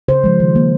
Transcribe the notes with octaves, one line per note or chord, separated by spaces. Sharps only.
C#3 C5
F3 G#3
D#3
A#3